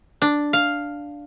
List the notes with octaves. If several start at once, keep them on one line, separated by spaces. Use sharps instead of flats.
D4
F5